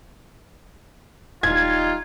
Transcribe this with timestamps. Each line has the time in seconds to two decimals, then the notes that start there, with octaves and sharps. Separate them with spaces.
1.43 D#1 G3 D#4 F4 G#6